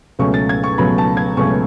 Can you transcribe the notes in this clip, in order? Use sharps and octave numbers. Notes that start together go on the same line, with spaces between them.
C#2 B2 F#3 A3 C#4 C#6
A6
G#6
C#6
C#2 B2 F#3 A3 C#4 B5
A5
G#6
C#2 B2 F#3 A3 C#4 C#6